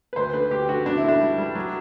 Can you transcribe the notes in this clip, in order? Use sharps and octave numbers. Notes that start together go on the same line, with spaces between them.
B4
D2 C5
D3 B4
D2 G4
D3 F#4
D2 D4
E4
D3 D4
G3
G3
F#3